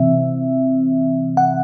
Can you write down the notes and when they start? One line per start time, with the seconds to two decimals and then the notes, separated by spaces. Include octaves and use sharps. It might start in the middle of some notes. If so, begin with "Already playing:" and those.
Already playing: C3 E3 C4 E5
1.37 F#5